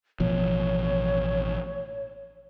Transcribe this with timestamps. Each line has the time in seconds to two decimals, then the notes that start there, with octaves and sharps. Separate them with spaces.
0.20 A1 B2 F3 C#5